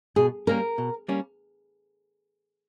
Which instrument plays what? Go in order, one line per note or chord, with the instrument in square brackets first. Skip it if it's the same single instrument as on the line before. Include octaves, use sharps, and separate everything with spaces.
[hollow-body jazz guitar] B2 [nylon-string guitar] G#4
[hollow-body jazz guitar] G3 A#3 C#4 [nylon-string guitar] A#4
[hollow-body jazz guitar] B2
G3 A#3 C#4